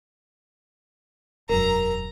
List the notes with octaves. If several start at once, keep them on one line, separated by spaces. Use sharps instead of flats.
E1 F#2 A#4 A#5